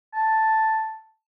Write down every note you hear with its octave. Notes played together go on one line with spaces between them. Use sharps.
A5